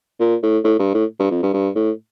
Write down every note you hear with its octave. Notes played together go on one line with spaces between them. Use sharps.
A#2
A2
A2
G2
A2
G2
F2
G2
G2
A2